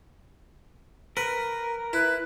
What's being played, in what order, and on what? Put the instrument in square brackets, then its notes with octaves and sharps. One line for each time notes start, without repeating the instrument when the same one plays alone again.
[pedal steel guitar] A#4 [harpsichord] B4
[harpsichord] E4 [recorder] B4